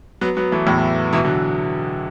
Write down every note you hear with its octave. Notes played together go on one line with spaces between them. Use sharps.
F#3 B3
F#3 B3
E3 A3
E2 A2
B2 E3
D3 F#3